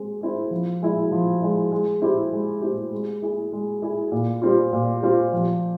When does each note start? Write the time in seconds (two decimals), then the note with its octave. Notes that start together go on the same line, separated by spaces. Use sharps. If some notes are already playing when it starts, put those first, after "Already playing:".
Already playing: G#3 C4
0.21 C4 E4 G#4
0.51 F3
0.82 G#3 E4
1.11 F3
1.42 G#3 E4
1.72 G#3
2.02 C4 E4 G4
2.32 G#3
2.61 C4 E4 G4
2.93 G#3
3.22 E4 G#4
3.53 G#3
3.82 E4 G#4
4.12 A#2
4.42 G3 C4 F4
4.73 A#2
5.02 G3 C4 F4
5.33 F3